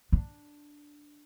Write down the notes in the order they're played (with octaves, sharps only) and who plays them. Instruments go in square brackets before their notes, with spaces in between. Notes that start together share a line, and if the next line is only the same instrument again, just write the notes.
[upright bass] D4